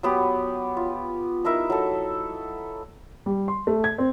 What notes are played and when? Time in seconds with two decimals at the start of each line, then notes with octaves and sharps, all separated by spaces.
0.03 F#3 B3 G4
0.77 F4
1.45 D#4 E4 A#4 E5
1.70 F#3 A4
3.26 G3
3.48 C6
3.67 A3
3.84 G#6
3.98 C4